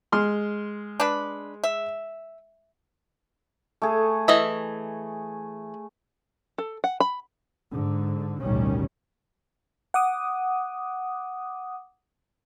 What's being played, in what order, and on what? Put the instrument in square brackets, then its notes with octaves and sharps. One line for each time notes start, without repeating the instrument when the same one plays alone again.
[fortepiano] G#3 C6 F6
[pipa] D4 B4
E5
[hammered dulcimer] A3 G#4
[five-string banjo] E3 D#5 E5
A4
F#5
B5
[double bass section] G#2 D3
A1 D2 B2 D#3 G3 C#4
[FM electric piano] F#5 D6 D#6